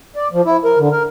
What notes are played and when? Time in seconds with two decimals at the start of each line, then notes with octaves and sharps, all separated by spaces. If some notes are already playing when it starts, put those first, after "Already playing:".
0.16 D5
0.33 F3
0.46 E4
0.64 A#4
0.79 D3
0.91 A#4